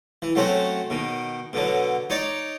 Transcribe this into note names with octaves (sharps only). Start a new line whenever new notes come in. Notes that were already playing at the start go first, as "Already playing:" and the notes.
E3
F#3 A3 C4 C#4 F#4
B2 D#3
B2 D3 F#3
D#4 C#5 D5